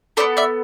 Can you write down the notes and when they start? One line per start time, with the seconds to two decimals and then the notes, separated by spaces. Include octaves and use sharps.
0.17 B3 E4 A4 C5 D5
0.37 D5 E5